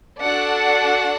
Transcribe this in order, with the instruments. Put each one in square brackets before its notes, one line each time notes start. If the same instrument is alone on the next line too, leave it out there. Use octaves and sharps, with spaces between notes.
[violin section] D4 F#4 A4 D5 F#5